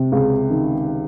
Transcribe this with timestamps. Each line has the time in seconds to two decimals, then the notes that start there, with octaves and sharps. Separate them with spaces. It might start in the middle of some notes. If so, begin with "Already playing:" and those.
Already playing: C3
0.12 C#2
0.50 D#3